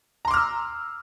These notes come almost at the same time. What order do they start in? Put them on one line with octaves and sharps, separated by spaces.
A#5 C6 D6 F6 E6